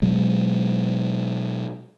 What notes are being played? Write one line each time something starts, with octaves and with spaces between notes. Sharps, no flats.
B2 F#3 G#3